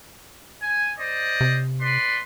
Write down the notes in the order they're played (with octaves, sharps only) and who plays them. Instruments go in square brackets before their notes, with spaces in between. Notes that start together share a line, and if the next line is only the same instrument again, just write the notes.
[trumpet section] G#5
C5 D5 D#5
[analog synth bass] C3
[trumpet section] B4 D5 C6